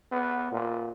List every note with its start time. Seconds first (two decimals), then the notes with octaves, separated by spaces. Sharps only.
0.12 B3
0.52 A#2